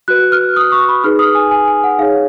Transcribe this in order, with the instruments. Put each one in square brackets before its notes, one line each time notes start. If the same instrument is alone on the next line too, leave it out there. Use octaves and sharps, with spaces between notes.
[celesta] F#4 B4 F#6
F6
D#6
C#6
B5
D#4 G#4 B4 F6
D#6
G#5
G#5
G#5
F#5
D#4 G#4 C#5 F5